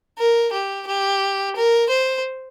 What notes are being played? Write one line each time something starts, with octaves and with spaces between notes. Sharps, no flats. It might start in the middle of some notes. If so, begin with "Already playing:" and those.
A#4
G4
G4
A#4
C5